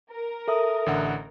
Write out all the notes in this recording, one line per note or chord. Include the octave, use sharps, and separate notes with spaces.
A#4
A4 E5 D#6
A1 D3 F#5